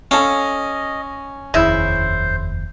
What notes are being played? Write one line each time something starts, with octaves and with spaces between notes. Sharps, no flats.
C#4 A4 D#5 F5
F1 D#2 C#3 E4 C5